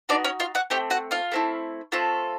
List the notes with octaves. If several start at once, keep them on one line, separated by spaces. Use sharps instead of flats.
B3 D4 D#4 F#4 D5
C#4 C#5
F4 F5
F#4 F#5
A3 C4 G4 G5
F#4 F#5
F4 F5
A3 C4 E4
A3 C4 F4 A4